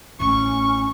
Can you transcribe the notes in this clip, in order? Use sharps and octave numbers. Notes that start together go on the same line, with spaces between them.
A1 A2 C#4 C#6